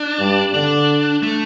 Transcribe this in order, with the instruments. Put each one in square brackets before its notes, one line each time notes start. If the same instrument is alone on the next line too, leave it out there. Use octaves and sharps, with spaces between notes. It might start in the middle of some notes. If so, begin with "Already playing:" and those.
Already playing: [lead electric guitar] D4
[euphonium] G2
[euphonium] D3 [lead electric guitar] D4
[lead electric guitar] A3